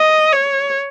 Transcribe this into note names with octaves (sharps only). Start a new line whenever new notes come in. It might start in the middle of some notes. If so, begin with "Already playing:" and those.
Already playing: D#5
C#5